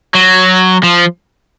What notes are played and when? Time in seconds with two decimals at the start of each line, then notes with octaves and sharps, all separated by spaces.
0.15 F#3
0.83 F3